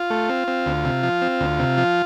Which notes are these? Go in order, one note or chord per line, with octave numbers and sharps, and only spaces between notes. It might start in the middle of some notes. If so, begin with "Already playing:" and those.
Already playing: F4
A3
C4
C4
D2
C3
F3
C4
D2
C3
F3